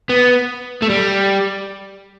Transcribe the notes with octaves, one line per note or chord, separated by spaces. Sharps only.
B3
A3
G3